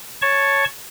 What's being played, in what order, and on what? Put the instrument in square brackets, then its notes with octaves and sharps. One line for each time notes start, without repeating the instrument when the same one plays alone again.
[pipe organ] C#5 A5 C#6